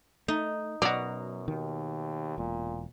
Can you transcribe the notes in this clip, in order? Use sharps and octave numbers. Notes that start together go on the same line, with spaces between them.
A3 D#4
F#2 B2 F#3 F#4 D5 A#5
D#2 D#3
E1 A#2